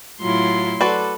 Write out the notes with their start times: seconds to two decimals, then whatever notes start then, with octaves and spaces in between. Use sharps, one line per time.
0.21 A2 F#3 E4 F4 C6
0.81 A3 F#4 A4 B4 D5 B5